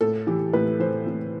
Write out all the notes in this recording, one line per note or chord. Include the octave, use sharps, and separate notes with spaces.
A2 A4
E3 G4
A2 B4
E3 C5
A2